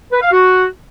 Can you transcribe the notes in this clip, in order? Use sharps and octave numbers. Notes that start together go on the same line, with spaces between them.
B4
F5
F#4